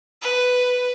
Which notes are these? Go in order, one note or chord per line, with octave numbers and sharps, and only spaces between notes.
B4